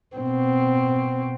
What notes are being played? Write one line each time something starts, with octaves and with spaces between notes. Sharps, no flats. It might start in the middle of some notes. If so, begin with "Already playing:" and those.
B2 C4